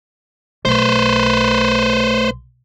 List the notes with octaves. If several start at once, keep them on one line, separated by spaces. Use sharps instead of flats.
B1 A3 B4 C5